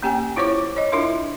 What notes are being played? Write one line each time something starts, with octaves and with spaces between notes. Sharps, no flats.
A#3 C#4 G4 G5 G#5
E4 F4 C5 C#5 C#6 D6
C#5 D#5
D4 E4 F4 A#4 E5 C6